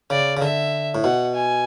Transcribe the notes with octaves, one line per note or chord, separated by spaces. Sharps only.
C#3 D5
C#3
D3 E5
A2
B2 F#5
G#5